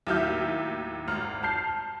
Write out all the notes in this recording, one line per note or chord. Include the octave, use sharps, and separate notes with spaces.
D#2 A2 F#3 E5 F6 G6
G#1 F6
A5 F6 G6 C7